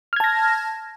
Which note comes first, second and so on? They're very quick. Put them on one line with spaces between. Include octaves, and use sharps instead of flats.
F6 G#6 A5 A#6